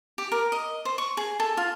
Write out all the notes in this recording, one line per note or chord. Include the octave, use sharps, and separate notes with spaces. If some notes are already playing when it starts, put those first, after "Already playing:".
G4
A#4
D#5
C5
C#6
G#4
A4
F4